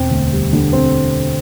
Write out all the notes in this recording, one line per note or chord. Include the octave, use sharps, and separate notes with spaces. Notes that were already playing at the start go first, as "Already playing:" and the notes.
Already playing: E1 C4 G5
D2
G3
D3
C4